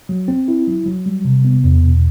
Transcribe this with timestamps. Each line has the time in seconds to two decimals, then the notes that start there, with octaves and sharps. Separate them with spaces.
0.09 F#3
0.28 C4
0.48 E4
0.67 F#3
0.86 F#3
1.06 G3
1.25 C3
1.45 B3
1.64 E2
1.83 B2